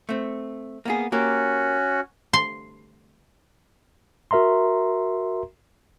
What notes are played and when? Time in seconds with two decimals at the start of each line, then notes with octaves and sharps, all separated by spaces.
0.09 A3 C4
0.85 A#3 B3 G#4
1.12 A#3 C#4 F#4 G4 A#4
2.33 C6
4.31 F#4 A#4 E5 A#5 C6